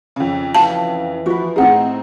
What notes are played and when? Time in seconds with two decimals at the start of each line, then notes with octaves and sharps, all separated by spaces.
0.16 F2 C#3
0.55 E3 F#4 F5 A5
1.26 F3 F#4 B4
1.56 A2 C4 D#4 G#4 F#5